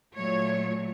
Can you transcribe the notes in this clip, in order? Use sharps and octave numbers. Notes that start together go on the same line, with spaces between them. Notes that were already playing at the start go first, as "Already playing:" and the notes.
A#2 F#3 A3 C#5